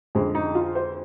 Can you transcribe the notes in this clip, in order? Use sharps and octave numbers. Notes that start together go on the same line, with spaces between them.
F2 D3 G#3
D#4
F4
C5